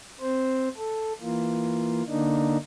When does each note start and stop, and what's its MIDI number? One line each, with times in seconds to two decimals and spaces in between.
0.21 0.68 60
0.21 0.68 72
0.77 1.13 69
1.21 2.03 52
1.21 2.03 58
1.21 2.03 65
2.08 2.57 50
2.08 2.57 58
2.08 2.57 62
2.08 2.57 63